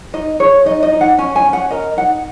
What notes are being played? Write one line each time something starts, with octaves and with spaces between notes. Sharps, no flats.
D#4 D#5
G#4 C#5
D#4 D#5
D#5
D#4
F#5
C#4 G#5
G#5
C#4
F#5
A#4 D#5
D#4 F#5